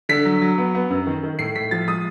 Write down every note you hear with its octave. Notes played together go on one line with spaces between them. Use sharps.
D3 B6
F#3
F#3
B3
B3
F#2
D#3
D#3
A2 C7
A2 B6
F3 A6
G#3 D#6